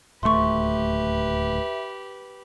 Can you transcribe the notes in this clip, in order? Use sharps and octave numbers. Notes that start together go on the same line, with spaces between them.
D1 D#2 A3 G4 B4 E5 C6 C#6